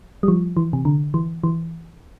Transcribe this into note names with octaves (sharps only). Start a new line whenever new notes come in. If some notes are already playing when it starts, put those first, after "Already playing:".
G3
F3
E3
C3
D3
E3
E3